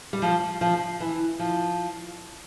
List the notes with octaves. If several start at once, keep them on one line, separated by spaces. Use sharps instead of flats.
G3
F3
F3
E3
F3